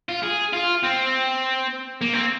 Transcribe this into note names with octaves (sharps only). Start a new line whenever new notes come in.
F4
G#4
F4
C4
A#3
C4